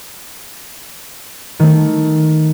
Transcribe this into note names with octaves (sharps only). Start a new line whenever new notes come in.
D#3 A3